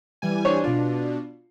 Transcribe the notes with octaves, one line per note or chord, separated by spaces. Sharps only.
E3 G3 G#5
D4 C5 C#5
B2 D4 F4